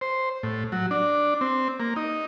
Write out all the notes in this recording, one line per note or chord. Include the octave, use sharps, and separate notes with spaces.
C5
A2
F#3
D4
C4
A#3
D#4